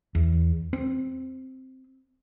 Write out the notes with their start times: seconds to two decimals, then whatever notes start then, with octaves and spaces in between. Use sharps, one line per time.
0.15 E2
0.73 C4